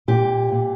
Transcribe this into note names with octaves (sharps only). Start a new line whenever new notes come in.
A#2 G4
A#2